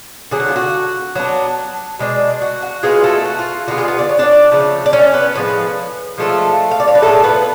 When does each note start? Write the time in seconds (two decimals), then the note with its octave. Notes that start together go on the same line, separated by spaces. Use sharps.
0.31 D3 F#3 A3 G#4
0.40 F#4
0.48 F4
0.56 F#4
1.15 F#3 B3 D4
1.99 B2 G#3 D4
2.42 F#4
2.62 F#4
2.83 F#3 G#3 B3 F4 G#4
3.04 A3 A4
3.25 F#4
3.39 F4
3.67 D3 G#3 B3 F4 F#4
3.78 G#3 G#4
3.88 B3 B4
3.99 D5
4.09 C#5
4.19 D4 D5
4.52 C#3 F3 A3
4.86 D5
4.93 C#4 C#5
5.14 B3 B4
5.35 A2 F3 G#3 B3 B4
6.18 F3 G#3 A3 D4 F4 A4
6.71 F5
6.80 D5
6.87 C#5
6.95 B4
7.02 A2 F3 G#3 A3 B3 A4
7.24 B3 B4